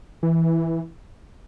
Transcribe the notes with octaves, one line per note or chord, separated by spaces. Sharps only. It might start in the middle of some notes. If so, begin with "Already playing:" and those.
E3